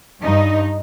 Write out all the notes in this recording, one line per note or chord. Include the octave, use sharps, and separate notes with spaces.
G2 D#4